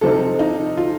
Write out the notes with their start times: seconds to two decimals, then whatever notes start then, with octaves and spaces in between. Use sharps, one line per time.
0.01 C3 F3 C4 D#4 A4
0.39 D#4
0.77 F4